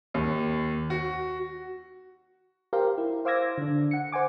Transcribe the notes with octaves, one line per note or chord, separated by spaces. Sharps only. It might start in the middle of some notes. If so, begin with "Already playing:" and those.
D#2
F#4
G4 A#4 C5 F5
E4
C5 F5 D6 E6 G#6 A#6
D3 D4
F#5 C#7
C5 F#5 G#5 D6